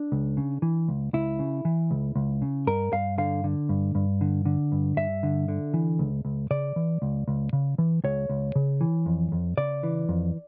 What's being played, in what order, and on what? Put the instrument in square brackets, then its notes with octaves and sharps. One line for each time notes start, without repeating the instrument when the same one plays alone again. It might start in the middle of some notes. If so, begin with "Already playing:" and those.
Already playing: [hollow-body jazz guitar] D4
C#2
C#3
E3
C#2
C#2 E4
C#3
E3
C#2
C#2
C#3
G2 A#4
G2 F5
D3 F5
D3
G2
G2
D3
D3
G2
G2 E5
D3
D3
E3
C#2
C#2
C#3 D5
E3
C#2
C#2
C#3
E3
C#2 C#5
C#2
C#3
E3
F2
F2
C#3 D5
E3
F2